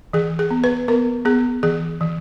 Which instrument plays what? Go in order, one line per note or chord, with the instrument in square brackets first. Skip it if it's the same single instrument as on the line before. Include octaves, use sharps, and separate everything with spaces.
[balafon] E3 G#4
G#4
B3
B4
B3 A#4
B3 G#4
E3 G#4
E3